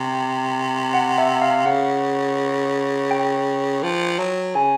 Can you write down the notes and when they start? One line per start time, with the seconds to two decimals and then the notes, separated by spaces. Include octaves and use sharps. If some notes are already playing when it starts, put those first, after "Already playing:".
Already playing: C3 G5
0.94 F#5
1.18 E5
1.42 F5
1.66 C#3 F#5
3.11 G5
3.83 F3
4.19 F#3
4.55 C#3 G#5